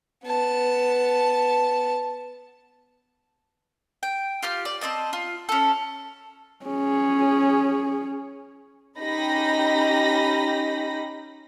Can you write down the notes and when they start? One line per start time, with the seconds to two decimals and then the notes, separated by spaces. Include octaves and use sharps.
0.25 B3 A5
4.03 G5
4.43 F4 G4 F6
4.65 D5
4.81 C4 C#4 D#5 A5
5.13 F4
5.49 C#4 A4
6.65 C#4 G#4
9.00 C#4 D#4 G4 B5 A#6